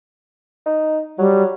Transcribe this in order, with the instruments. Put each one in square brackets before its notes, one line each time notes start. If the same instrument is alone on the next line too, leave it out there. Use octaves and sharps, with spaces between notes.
[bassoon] D#4
[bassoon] F#3 [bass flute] G3